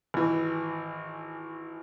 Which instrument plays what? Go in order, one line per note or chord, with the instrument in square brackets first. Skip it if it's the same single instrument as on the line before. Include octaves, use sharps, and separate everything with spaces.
[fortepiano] G#1 E3